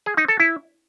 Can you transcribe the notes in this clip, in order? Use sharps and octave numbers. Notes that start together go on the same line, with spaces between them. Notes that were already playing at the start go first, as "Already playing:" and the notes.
G#4
D#4
A4
E4